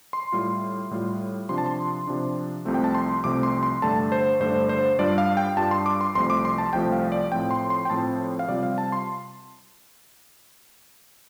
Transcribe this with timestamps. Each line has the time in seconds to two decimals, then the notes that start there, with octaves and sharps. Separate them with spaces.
0.13 C6
0.32 A2 G3 F4
0.91 A2 G3 F4
1.49 C3 F3 D4 C6
1.58 A5
1.66 C6
2.07 C3 F3 D4
2.65 C2 C3 F3 A3 C4
2.74 G5
2.84 A5
2.95 C6
3.24 C2 C3 F3 A3 C4 D6
3.43 C6
3.63 C6
3.82 G2 D3 A3 D4 A5
4.12 C5
4.40 G2 D3 A3 D4 C5
4.69 C5
4.99 G2 G3 D4 F4 D5
5.18 F5
5.37 G5
5.57 G2 G3 D4 F4 A5
5.71 C6
5.86 D6
6.01 C6
6.15 C2 C3 F3 A3 C6
6.30 D6
6.45 C6
6.58 A5
6.73 C2 C3 F3 A3 G5
6.92 F5
7.12 D5
7.32 A2 F3 C4 G5
7.51 C6
7.70 C6
7.85 G5
7.90 A2 F3 C4 A5
8.39 F5
8.48 C3 G3 C4 F4 D5
8.63 F5
8.78 A5
8.92 C6